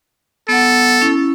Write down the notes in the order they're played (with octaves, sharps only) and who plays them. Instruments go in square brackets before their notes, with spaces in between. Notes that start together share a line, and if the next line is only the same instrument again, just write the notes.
[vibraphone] B3 F#5 [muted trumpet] A4
[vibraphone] C#4 E4